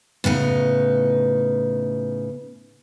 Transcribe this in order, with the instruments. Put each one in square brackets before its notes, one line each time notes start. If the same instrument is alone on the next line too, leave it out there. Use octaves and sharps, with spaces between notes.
[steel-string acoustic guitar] A2 C#3 B3 D#4